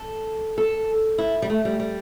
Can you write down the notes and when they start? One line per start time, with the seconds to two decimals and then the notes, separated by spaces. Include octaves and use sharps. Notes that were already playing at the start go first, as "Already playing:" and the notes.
Already playing: A4
0.58 A4
1.18 E4
1.42 G3
1.50 A3
1.65 G3
1.80 G3